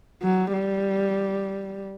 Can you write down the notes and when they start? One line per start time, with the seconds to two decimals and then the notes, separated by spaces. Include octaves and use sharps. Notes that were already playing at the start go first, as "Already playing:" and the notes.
0.22 F#3
0.53 G3